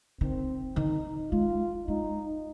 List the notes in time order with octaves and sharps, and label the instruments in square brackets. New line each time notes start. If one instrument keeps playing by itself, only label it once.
[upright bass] D#3 [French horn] C4
[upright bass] D#3 [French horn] D#4
[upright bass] G#3 [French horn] F4
[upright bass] G#3 [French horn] D#4